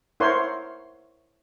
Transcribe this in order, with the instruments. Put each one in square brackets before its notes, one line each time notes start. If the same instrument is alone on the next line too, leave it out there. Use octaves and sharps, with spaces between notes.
[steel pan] E4 A#4 C5 C#5 F#5 C6